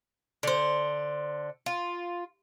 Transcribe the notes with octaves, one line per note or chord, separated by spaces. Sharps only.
D3 C5
F4